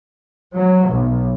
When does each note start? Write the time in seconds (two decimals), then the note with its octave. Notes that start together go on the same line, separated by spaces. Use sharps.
0.54 F#3
0.88 B1